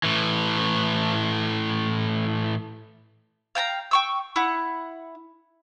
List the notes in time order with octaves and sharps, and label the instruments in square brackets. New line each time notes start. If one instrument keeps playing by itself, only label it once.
[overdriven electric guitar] A2 E3
[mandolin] F5 G5 A5 A#5
G5 C#6 E6
E4 F#5